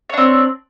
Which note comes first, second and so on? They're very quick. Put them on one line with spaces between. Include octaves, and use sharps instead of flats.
C#5 D4 C4